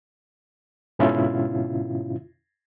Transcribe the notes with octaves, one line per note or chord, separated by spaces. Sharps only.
G#2 B2 D3 C#4 E4 F4